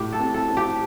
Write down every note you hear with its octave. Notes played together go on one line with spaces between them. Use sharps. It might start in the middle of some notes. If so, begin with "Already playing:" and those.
Already playing: A2 G4
A4
C4
A4
C4
G4